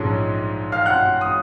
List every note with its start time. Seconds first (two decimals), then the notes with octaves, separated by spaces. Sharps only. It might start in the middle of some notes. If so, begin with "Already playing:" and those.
Already playing: A#1 G#2 F3 G#3 C#4
0.72 F5 F6
0.86 F#5 F#6
1.21 D#6